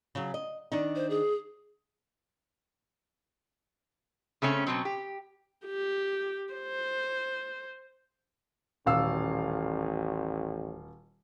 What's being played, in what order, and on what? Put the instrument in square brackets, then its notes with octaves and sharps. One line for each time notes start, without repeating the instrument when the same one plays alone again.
[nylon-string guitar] C#3 F#3
D#5
D#3 D4 D#4
[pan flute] C5
G#4
[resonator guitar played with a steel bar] C#3 A3 C4 C#4
B2 F#3 C4
G4
[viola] G4
C5
[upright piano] D#1 F5 E6 [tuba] A1